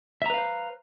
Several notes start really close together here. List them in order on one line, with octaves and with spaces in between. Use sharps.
E5 A#5 B4 F5 C5